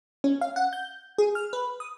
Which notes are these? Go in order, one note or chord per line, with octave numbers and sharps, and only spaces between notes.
C#4
F5
F#5
G6
G#4
F6
B4
D#6